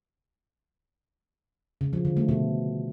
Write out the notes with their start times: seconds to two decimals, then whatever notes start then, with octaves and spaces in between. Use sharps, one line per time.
1.81 C#3
1.93 F3
2.05 D3
2.17 A3
2.29 B2